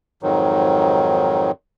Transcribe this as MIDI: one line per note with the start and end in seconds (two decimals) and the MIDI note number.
0.23 1.51 41
0.23 1.51 44
0.23 1.51 51
0.23 1.51 54